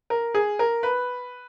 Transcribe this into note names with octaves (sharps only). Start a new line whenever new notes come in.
A#4
G#4
A#4
B4